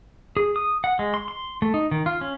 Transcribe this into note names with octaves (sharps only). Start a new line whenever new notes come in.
G#4
D#6
F#5
G#3
C6
C6
A3
D#4
D#3
F4
C#4